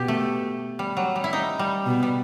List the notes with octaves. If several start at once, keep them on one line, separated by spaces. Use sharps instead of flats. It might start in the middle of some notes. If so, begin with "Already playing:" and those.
Already playing: B2 G4
A3
G3
F#3
G3
E4
D#4
G3
B2
G3